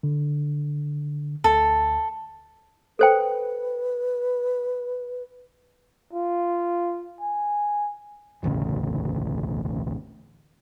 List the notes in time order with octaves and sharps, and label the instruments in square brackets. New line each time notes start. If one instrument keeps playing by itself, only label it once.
[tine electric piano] D3
[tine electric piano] D2 [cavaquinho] A4
[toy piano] A4 C5 G5 [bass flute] B4
[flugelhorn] F4
G#5
[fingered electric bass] E1 A1 D2 C#3